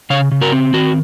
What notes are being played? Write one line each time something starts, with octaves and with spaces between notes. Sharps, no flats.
C#3 C#5 F5
C#3
F#4 A#4
C4
D#3 F#4